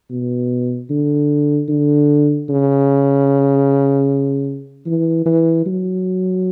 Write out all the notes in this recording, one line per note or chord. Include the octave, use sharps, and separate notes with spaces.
B2
D3
D3
C#3
E3
E3
F#3